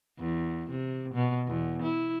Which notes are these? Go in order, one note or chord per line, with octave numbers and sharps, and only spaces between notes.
E2
C3
B2
E2
E4